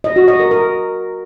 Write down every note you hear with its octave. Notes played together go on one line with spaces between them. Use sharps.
D#5
F#4
D#5
A#4
A#4